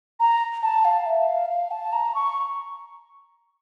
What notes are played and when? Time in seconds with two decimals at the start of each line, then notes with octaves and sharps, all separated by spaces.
0.20 A#5
0.63 A5
0.85 F5
1.06 E5
1.28 F5
1.50 F5
1.71 A5
1.93 A#5
2.15 C#6